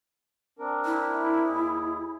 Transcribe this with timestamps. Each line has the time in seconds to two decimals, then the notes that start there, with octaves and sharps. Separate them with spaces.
0.59 C4 D4 A#4
0.85 E4
1.45 D#2 G#4